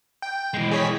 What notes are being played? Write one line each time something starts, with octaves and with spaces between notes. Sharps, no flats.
G5
E3 G#3
G#4 C#5 B6